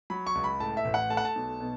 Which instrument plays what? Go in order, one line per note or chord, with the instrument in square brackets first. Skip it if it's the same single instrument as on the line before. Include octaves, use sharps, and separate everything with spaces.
[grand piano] F#3 B5
C#6
C#2
B5
A2 A5
E5
A1
F#5
A3 A5
F#5
A5
B1
B2